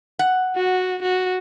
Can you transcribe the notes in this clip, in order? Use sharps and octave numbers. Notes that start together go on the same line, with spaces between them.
F#5
F#4
F#4